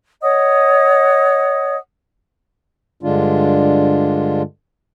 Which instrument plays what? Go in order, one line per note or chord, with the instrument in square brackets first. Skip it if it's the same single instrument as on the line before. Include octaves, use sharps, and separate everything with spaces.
[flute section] C#5 D#5 F#5 D#6
[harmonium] G2 D3 G#3 D4 F4